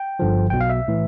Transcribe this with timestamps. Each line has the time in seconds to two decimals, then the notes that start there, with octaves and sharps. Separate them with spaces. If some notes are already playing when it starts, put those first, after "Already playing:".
Already playing: G5
0.19 G1 G2 D3 F3
0.50 B1 B2 G5
0.61 F5
0.70 E5
0.88 A2 E3